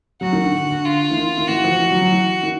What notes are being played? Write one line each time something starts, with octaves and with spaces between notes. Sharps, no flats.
F#3 F#4
D#3
D3
D3
D3
F4
E3
D#3
D#3
E3 F#4
F3
E3
F#3
F#3
E3
D#3